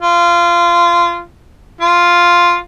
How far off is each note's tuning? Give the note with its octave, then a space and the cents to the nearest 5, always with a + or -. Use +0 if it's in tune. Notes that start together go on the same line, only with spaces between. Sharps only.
F4 -20
F4 +0